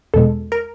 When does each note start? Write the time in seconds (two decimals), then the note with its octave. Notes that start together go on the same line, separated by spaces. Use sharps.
0.14 E2 B2 G#3 A4
0.52 A#4